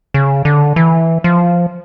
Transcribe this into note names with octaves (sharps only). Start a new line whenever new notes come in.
C#3
D3
E3
F3